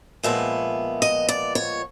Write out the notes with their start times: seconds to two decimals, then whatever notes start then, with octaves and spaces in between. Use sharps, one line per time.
0.23 A#2 F3 G#3 B3 E5
1.02 D#5
1.29 D5
1.55 C#5